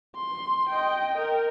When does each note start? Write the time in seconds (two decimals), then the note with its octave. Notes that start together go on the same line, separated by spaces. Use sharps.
0.16 C6
0.69 D#5 G5
1.18 A#4